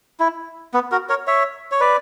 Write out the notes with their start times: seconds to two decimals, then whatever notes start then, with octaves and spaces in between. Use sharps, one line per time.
0.20 E4
0.74 B3
0.92 F#4 A#4
1.09 A#4 C#5
1.27 C#5 E5
1.71 C#5
1.80 B4 D5